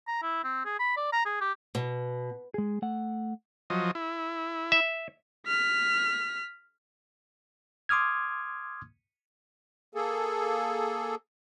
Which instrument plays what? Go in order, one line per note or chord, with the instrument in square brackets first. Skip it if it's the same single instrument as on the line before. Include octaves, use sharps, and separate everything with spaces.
[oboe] A#5
E4
C4
G#4
B5
D5
A#5
G#4
G4
[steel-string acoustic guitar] B2
[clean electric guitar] G#3 G#4
A3 F#5
[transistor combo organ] F3 F#3 D#5
E4
[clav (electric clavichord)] E5
[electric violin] F6 B6
[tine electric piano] C6 D6 D#6 F6 G#6
[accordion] A#3 G#4 A4